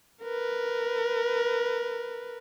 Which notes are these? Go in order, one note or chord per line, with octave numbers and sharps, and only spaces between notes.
A#4 B4